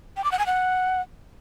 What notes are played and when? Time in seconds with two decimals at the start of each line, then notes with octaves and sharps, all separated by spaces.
0.17 G5
0.24 D6
0.32 F#5
0.39 G#5
0.46 F#5